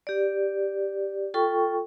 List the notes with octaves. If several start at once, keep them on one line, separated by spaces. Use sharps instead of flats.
G4 D5
F4 A4 G5 C#6